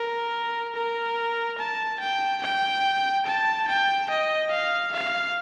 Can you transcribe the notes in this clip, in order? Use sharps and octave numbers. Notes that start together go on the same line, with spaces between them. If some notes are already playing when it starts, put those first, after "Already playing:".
Already playing: A#4
A#4
A5
G5
G5
A5
G5
D#5
F5
F5